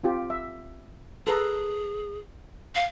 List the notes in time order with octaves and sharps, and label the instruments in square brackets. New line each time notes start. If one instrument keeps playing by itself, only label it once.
[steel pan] C4 F4 G4
E5
[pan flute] G#4 [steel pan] A4 B4 A#5
[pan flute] F5